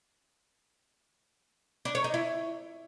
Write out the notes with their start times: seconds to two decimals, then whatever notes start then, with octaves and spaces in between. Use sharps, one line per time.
1.85 D4
1.95 C#5
2.04 D#4
2.14 E4